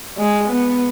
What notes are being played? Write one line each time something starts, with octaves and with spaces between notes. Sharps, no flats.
G#3
B3